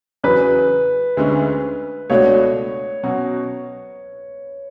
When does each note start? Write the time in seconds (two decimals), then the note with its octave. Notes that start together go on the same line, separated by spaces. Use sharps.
0.24 E2 C#3 F#3 B4
1.17 D2 D3 G#3 C#4
2.10 C#2 B2 A3 D4 F#4 C#5
3.03 B2 F#3 C#4 F#4